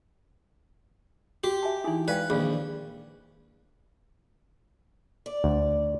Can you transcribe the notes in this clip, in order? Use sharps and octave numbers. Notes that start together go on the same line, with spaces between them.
F#4 G4
E5 G#5 A5
E3 D#4 E4 G#4 G#5
G#3 B4 D5 F5 G5
A#1 D#3 G#4 B4 D5 F5 B5
D5
D2